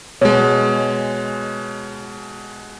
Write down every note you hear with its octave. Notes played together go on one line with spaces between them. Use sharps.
B2 G#3 C#5